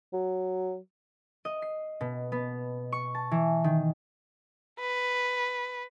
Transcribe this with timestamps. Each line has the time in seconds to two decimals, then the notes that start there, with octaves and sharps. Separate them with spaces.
0.13 F#3
1.45 D#5
1.62 C7
2.01 B2
2.32 B3
2.92 C#6
3.15 A5
3.31 E3
3.64 D#3
4.80 B4